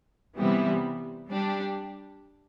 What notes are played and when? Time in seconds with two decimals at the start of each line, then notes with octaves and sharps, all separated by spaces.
0.37 C3 E3 G3 B3 E4
1.29 G3 D4 G4